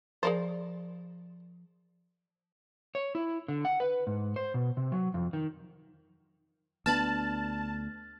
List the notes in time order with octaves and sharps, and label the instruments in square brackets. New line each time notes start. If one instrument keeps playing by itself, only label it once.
[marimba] F3 D5 C6 [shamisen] G#4 A#4 C5
[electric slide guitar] C#5
E4
D3
F#5
B4
G#2
C5
B2
C3
F#3
F2
D#3
[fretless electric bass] D2 B3 D4 [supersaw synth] A5 [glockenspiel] F6 A6 F#7